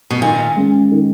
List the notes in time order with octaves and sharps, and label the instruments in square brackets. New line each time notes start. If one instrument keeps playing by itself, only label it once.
[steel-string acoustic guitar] B2
[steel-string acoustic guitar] A#2 [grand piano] D#3
[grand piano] G#3 C#4
D#3